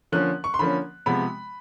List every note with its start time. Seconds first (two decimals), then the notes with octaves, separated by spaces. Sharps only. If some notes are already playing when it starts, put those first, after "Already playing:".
0.12 D3 F3 A#3 C#4 F#6
0.44 C#6
0.54 C6
0.59 D3 F3 A#3 C#4 B5
1.06 C3 F3 G#3 B3 B5